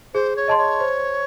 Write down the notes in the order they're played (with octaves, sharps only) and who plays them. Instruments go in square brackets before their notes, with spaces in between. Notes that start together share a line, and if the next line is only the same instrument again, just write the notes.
[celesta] G#4 [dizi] C5
[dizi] C#5
[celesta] D#5 A5 C6
[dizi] C#5
[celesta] C5